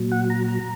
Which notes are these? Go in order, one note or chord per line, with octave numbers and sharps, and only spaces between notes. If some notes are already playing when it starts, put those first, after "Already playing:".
Already playing: A#2 F#3
F#5
A#5
A#5